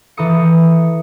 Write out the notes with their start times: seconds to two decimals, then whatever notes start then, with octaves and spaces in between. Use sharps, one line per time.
0.17 E3 A4 A#5 D#6 C#7